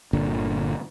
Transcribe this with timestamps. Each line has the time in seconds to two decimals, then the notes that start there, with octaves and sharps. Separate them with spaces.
0.13 G1 A#2 D3